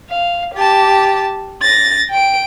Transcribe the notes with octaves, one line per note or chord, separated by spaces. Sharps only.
F5
G4 A5
A6 A#6
G5 D7